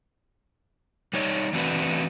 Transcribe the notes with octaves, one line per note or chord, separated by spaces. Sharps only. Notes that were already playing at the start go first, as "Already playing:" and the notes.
G3 D#4 C#5
E3 A3 C4 D4 F#4 B4